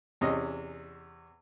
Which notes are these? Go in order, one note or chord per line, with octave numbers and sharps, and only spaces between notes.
E2 C3 C#4 D#5